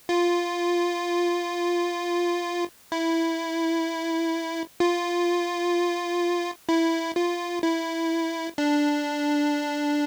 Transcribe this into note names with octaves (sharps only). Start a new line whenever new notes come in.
F4
E4
F4
E4
F4
E4
D4